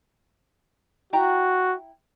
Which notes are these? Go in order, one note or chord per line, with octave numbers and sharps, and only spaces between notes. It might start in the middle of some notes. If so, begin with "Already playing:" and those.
E4 F#4 G5 A#5